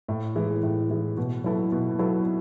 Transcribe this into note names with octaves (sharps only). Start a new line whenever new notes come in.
A2
E3 G#3
A2
E3 G#3
B2
F#3 B3 E4 A4
B2
F#3 B3 E4 A4